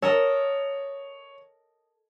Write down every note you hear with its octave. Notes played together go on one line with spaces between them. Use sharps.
A4 A#4 C#5 D#5